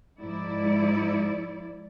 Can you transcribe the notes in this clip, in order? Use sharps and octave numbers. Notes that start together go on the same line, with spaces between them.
G#2 F3 E4 D5